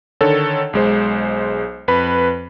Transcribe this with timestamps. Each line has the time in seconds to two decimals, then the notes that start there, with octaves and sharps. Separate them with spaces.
0.21 D3 D#3 A4 C#5
0.73 B1 G#3 C5
1.88 F2 B4 B5